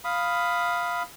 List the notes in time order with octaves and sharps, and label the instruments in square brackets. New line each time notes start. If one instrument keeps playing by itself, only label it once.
[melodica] F5 B5 D#6